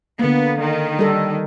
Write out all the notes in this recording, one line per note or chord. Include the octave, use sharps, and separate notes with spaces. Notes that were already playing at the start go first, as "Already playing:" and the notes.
D3 A#3 B3
D#3
G3 A4